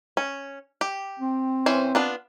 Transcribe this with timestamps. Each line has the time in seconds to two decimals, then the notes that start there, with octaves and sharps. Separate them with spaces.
0.17 C#4
0.81 G4
1.20 C4
1.66 E3 C#4 C5
1.95 B3 D4 F4